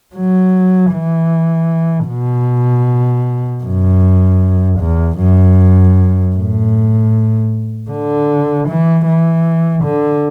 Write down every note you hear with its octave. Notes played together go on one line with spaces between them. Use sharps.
F#3
E3
B2
F#2
E2
F#2
A2
D3
E3
E3
D3